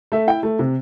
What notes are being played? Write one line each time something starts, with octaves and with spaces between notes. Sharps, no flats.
A3 E5
E4 G5
A3
C3